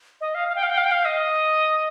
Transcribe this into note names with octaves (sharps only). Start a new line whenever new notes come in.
D#5
F5
F5
G5
F5
G5
F5
G5
F5
D#5